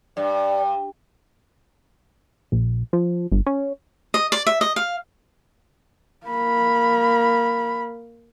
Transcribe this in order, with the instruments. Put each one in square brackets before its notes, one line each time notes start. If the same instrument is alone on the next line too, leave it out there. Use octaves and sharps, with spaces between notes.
[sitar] G2 [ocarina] D5
[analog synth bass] A#1
F3
G1
C#4
[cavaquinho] D#5
D5
E5
D#5
F5
[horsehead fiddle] A#3 B5